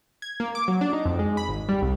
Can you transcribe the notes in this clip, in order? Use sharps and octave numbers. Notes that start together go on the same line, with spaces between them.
G#6
A#3
D6
F#3
D4
D#4
F2
G#3
B5
G#1
G3
C2